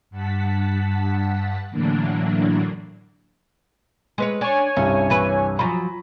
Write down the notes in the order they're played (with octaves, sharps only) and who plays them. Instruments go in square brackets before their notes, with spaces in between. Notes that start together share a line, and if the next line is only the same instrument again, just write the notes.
[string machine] G2 F#5 A5 B6
A2 D3 E3 F#3 A#3 D4
[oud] G#3 B4 C#5
[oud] D4 [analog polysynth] C#5 G#5
[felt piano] C2 G2 [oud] C#4
[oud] E3 B4
[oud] F3 F#3 [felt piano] G#5 A#5 B5